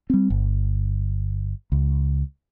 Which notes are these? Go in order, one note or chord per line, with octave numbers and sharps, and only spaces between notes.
G3 C4
G1
C#2